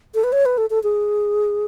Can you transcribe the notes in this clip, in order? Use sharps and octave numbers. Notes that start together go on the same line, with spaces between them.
A4
B4
C#5
B4
A4
A4
G#4